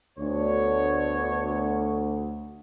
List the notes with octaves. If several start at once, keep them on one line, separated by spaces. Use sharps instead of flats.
D2 B3 D4 C#5